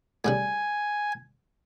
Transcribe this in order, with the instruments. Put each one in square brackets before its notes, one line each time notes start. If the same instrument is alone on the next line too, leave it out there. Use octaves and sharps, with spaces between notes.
[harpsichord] A2 C#3 G3 [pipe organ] G#5